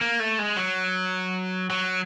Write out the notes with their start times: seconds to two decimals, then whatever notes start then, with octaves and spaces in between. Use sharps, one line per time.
0.01 A#3
0.20 A3
0.39 G#3
0.57 F#3
1.70 F#3